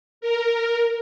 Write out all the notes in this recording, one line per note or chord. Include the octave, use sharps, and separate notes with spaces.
A#4